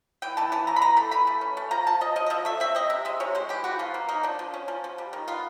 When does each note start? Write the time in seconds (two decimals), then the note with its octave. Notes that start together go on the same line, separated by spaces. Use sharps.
0.22 E3 G5
0.37 E3 A5
0.52 E3 A5
0.67 E3 A#5
0.76 B5
0.82 E3 A#5
0.97 A3 B5
1.11 E3 B5
1.27 A3
1.41 C#4
1.57 A3
1.71 F3 A#5
1.87 F3 A5
2.01 F3 D#5
2.16 F3 D#5
2.26 D#5
2.30 F3 E5
2.45 A3 E5
2.60 C4 E5
2.75 C4 D#5
2.90 C3 E5
3.05 G#3 E5
3.20 C3 C#5
3.35 G#3 C5
3.49 E3 G4
3.64 E3 F#4
3.79 F3 F4
3.94 A#3
4.09 A#3 D#4
4.23 F3 D4
4.39 F3
4.54 C#4
4.68 F3
4.84 F3
4.98 G3
5.13 D#3
5.28 B3 F4